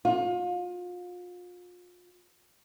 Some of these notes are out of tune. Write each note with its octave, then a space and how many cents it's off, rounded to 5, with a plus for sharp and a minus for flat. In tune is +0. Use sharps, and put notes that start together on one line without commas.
F4 +35